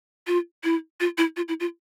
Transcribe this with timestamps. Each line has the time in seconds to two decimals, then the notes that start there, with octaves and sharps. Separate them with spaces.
0.27 F4
0.64 E4
1.00 F4
1.18 E4
1.37 F4
1.48 E4
1.60 F4